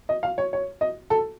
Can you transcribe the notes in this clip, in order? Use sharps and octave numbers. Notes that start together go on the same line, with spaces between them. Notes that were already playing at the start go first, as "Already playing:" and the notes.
D#5
F5
C#5
C#5
D#5
A4